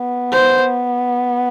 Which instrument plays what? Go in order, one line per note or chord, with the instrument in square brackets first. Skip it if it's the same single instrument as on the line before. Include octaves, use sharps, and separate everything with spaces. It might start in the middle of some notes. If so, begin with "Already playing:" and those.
Already playing: [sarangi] B3
[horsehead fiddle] C5